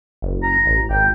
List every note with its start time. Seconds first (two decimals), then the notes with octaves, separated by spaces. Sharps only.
0.22 F#1
0.43 A#5
0.66 A1
0.90 G#1 G5